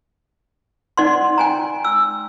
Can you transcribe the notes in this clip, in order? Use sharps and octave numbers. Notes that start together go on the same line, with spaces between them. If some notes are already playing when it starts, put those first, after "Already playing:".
D#4 D5 F#5 C6
G5 G#5 A#5
E6